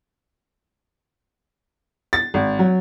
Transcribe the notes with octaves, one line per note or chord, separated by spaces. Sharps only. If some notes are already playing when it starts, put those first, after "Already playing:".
A6
G#1
F#3